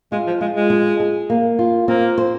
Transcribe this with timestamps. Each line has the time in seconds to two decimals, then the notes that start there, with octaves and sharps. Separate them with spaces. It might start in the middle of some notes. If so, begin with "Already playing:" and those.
0.12 G#3 F4
0.27 F3
0.41 G#3 F4
0.56 G#3
0.70 G#4
1.00 G#4
1.30 A#3
1.59 F4
1.88 A#3 C4
2.18 C5